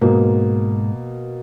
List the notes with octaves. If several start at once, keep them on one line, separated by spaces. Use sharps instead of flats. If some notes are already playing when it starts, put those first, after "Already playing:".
G#2 B2 A#3